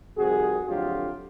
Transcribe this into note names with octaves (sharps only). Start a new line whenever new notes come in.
F2 C3 D#3 G3 F#4 G#4
F2 D3 F#3 A3 F4 G4